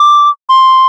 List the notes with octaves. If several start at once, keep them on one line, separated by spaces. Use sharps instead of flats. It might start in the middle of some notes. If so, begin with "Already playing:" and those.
Already playing: D6
C6